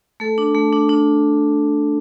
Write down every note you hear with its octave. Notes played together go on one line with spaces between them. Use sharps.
A3 A4
D4
A3
D4
D4